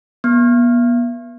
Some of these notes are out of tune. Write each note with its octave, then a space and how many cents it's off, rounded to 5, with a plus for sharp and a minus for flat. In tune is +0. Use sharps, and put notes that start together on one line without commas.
B3 -40